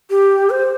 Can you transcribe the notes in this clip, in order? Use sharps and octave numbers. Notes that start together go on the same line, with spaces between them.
G4
C5